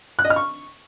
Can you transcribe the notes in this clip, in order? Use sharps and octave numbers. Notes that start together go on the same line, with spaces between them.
F#6
D#5
F6
C#6